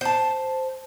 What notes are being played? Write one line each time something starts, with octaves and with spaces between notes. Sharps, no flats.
C5 A5